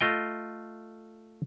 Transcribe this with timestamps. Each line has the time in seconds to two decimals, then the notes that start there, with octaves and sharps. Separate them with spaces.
0.01 A3 F4 D#5 G5